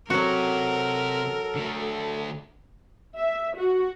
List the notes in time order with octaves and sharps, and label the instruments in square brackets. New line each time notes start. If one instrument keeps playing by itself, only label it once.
[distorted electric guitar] C3 [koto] F#3 F#4 [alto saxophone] A4 [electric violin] A#4
[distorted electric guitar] D3 A3
[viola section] E5
F#4